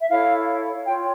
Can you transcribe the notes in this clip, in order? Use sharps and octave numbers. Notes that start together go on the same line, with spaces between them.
E5
E4 A4 C#5 F5
F4 C#5 G5